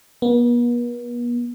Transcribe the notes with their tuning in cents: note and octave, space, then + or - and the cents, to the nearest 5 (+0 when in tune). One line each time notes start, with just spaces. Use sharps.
B3 -45